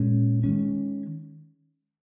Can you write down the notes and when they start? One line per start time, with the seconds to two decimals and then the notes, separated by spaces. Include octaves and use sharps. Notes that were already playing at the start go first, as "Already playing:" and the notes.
Already playing: A#2 G#3 C#4
0.44 D#3 G#3 C#4